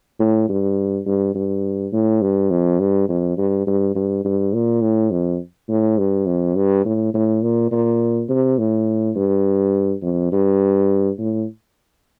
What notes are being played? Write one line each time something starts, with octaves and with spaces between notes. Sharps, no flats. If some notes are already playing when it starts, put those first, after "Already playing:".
A2
G2
G2
G2
A2
G2
F2
G2
F2
G2
G2
G2
G2
A#2
A2
F2
A2
G2
F2
G2
A2
A2
A#2
A#2
C3
A2
G2
F2
G2
A2